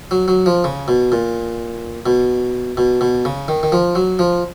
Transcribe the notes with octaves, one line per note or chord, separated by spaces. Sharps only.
F#3
F#3
F3
C#3
B2
A#2
B2
B2
B2
C#3
D#3
D#3
F3
F#3
F3